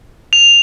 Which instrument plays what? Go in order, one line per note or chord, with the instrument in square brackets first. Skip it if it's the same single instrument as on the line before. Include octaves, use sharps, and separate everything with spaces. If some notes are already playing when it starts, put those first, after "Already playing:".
[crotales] F7